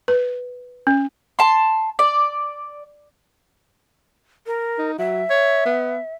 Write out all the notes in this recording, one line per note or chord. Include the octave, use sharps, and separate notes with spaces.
B4
C#4
A5 C6
D5
A#4
D#4
F#3 E5
C#5
B3